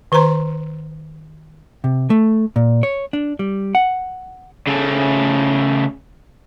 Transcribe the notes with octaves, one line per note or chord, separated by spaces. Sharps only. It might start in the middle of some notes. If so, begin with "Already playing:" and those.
D#3 B4 C5 A#5 C6
C3
A3
A#2
C#5
D4
G3
F#5
C#3 A3